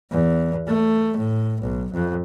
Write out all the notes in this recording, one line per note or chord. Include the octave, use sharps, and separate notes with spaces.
E2
A3
A2
B1
F2